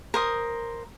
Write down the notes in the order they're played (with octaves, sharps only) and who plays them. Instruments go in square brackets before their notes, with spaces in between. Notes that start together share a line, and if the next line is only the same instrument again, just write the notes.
[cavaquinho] A#4 C5 D#6